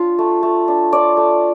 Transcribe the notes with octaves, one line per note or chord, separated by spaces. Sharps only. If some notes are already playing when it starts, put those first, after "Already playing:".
Already playing: D4 F4
A3
A3
D4
F4 D5
A3